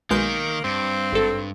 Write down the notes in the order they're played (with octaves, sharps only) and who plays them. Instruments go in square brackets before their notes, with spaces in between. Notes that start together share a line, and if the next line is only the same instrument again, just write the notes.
[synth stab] B1 G#3 G6 [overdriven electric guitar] D#3 [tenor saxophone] A#3
[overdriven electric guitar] G2 [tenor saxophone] C4
[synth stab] G#1 A4